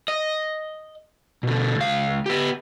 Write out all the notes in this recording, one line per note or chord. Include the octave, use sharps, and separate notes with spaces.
D#5
B2 D3
C#2 F5
B3 G4